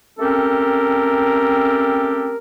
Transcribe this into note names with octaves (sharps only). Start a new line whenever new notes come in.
A3 C4 C#4 G4 A4 A#4